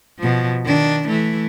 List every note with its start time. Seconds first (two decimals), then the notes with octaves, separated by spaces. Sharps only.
0.19 B2 F3
0.65 D#3 D4
1.08 E3 A3